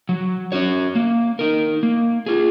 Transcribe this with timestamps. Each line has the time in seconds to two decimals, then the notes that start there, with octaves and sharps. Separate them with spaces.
0.09 F#3
0.52 C#4 F#4 C#5
0.95 A#3
1.39 D#4 A#4
1.83 A#3
2.26 F4 G#4